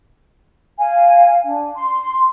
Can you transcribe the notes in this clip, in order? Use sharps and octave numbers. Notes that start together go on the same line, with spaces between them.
F5 G#5
D4
C6